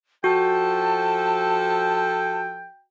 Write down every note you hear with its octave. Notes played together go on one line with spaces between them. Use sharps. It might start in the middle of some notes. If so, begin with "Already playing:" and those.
F3 F#4 A4 G5 A5